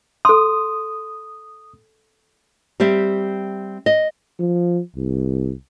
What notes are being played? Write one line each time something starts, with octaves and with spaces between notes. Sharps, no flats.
A4 C6 D#6
G3 C4 G4 E5
D#5
F3
C2